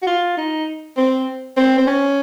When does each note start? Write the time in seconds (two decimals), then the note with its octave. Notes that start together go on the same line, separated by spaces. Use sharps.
0.02 F#4
0.07 F4
0.37 D#4
0.97 C4
1.57 C4
1.78 C4
1.87 C#4